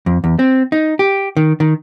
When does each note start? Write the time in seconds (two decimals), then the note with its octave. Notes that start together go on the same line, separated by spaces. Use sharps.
0.06 F2
0.24 E2
0.39 C4
0.72 D#4
0.99 G4
1.37 D#3
1.60 D#3